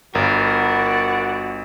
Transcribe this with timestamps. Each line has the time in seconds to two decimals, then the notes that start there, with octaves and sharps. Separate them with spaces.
0.15 G1 E4 F#4 A#4 D5 F#5